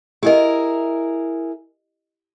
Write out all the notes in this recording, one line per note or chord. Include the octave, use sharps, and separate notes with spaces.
E4 G4 G#4 A#4 D#5